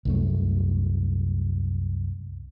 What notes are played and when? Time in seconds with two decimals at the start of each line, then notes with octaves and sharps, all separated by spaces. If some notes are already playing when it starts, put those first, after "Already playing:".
0.05 C2 F#2 A3